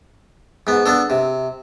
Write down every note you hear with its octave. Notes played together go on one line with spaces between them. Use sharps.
G#2 B3
B3 D4 A4
C3